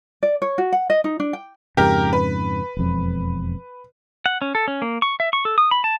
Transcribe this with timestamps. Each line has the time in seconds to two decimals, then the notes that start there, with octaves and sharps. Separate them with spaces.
0.23 D5
0.42 C#5
0.58 F#4
0.72 F#5
0.90 D#5
1.04 D#4
1.20 D4
1.33 G5
1.77 F2 G#2 C#3 G4 A#4
2.13 B4
2.77 E1 F2
4.26 F#5
4.42 C#4
4.55 A4
4.68 C#4
4.82 A#3
5.02 C#6
5.20 E5
5.33 C#6
5.45 A4
5.58 D#6
5.71 B5
5.84 A5